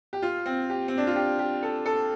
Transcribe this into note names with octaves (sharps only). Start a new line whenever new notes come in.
G4
F4
C4
G4
C4
D4
F4
G4
G4
A4
A4